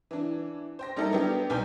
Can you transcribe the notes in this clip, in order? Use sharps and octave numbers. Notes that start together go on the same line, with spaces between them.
E3 D4
C5 G5 A#6
G3 A#3 D#4 E4 A4 A#4
F#3 B3 D4 G4
B1 G3 B3 G#5 G6